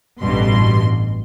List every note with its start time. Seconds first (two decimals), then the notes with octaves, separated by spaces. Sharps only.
0.20 A1 G2 B2 C6